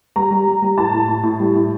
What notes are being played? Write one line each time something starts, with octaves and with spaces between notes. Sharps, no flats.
G3 A#5
G3
G3
G3
A2 A5
A2
A2
A2
G3
A2